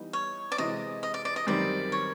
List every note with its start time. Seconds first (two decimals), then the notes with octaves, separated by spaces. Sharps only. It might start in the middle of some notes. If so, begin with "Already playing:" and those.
Already playing: E3 G3 B3 D#4
0.13 C#5
0.52 D5
0.58 C3 E3 G#3 D#5
1.03 D#5
1.14 D5
1.25 D5
1.36 D#5
1.47 F#2 D#3 G3 C4 D5
1.92 C#5